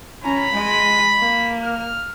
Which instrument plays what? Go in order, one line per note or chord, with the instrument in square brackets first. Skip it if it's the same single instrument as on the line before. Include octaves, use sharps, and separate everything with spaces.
[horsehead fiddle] C#4 A#5 [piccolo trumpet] B5
[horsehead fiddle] G#3 D#5
A#3
[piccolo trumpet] F6